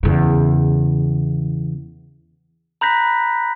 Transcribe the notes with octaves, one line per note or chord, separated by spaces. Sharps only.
E2 C#3
A#5 B5 F#6 G6 A#6 B6